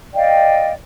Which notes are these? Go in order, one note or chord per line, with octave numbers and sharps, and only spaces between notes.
D5 D#5 F5 G5